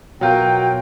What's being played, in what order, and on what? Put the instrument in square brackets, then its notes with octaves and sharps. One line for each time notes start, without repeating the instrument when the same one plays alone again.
[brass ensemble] B2 [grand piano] F#3 F4 A#4 [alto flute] G5